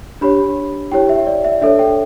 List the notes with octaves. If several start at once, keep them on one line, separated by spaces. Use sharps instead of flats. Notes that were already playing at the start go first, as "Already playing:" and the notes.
D4 G4 C#5 B5
E4 G4 C#5 G5
E5
D5
E5
D4 A4 C#5 E5
G5